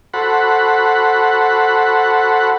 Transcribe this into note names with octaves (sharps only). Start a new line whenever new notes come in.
F#4 A4 C5 F#5 B5